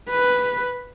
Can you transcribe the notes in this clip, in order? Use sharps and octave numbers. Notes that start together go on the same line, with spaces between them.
B4